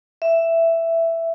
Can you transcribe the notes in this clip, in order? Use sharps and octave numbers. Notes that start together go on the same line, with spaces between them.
E5